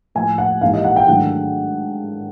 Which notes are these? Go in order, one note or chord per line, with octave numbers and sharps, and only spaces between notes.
A2 F3 A#3 G#5
F#5
G#2 E3 G3 A#3 D#4 F5
D#5
F#5
G5
G#2 D#3 F#3 A3 D4 F#5